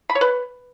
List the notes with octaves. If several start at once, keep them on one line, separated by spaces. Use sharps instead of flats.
B5
C#5
B4